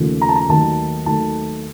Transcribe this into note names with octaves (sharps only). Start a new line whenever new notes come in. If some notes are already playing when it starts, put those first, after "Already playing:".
Already playing: D#2 C#3 F3 A3
A#5
A5
A#5
D#2 D#3 F#3 A3 A5
D#2 D#3 F#3 A3 A5